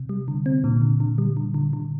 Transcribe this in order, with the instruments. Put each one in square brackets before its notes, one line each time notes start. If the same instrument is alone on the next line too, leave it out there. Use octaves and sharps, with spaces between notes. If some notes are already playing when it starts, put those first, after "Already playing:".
Already playing: [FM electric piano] C3
[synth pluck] G3
D3
C4
[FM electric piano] A#2 [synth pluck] D3
[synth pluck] D3
D3
G3
D3
D3
D3